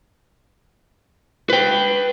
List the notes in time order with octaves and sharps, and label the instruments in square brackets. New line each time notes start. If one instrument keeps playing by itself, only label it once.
[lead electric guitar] B4 G5